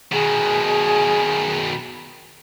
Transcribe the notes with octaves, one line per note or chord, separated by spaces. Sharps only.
B2 D#3 G#4